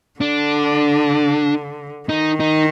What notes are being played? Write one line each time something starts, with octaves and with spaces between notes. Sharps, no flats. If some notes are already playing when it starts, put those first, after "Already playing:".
D3 D4
D#3 D#4
D#4